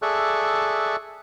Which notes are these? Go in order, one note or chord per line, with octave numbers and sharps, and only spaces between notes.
G#4 A4 D5 E5 C#6 F#6